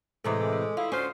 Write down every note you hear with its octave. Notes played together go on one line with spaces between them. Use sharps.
A2 C3 E3 G#3 A4 C5
G#4 A4 D6
A4
E4 F4 F5 D#6
D2 C#4 F4 C5 C7